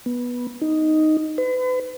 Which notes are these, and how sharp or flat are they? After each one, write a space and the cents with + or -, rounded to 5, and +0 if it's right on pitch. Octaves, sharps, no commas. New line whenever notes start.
B3 -15
D#4 +0
B4 +40